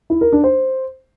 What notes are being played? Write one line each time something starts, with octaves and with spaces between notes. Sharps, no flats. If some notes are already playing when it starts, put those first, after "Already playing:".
E4
A#4
D4
C5